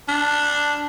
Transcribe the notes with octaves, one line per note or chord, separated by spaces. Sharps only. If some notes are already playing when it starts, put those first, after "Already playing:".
D4